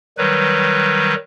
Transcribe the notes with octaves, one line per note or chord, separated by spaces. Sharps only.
D#3 F#3 G3 B4